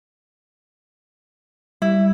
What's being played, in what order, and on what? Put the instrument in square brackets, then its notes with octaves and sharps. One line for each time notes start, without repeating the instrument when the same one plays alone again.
[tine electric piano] G3 [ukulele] E4